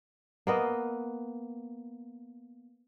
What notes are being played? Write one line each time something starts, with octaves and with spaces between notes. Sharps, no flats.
A#3 B3 D#5